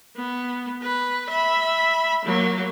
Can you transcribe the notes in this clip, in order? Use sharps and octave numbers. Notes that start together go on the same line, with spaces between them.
B3
B4
E5 B5
F#3 A#3